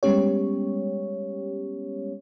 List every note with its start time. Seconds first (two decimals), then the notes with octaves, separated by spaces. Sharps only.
0.03 G3 G#3 B3 C#4 G4 C#5